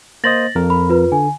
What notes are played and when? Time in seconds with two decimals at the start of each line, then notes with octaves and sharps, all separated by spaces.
0.24 A#3 C5 D#5 A6 A#6 F#7
0.55 F2 A#4
0.70 B5
0.89 F4 B4
1.12 D3 G#5